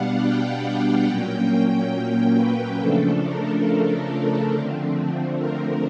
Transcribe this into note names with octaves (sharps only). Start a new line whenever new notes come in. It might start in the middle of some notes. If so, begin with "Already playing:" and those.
Already playing: B2 G3 B3 D4 F5 F#5
G5
F#5
A#2 F#3 A#3 C#4 G5
B4
C#3 F3 A3 D4 A4
A#4
A#4
D3 F3 A3 C4
A#4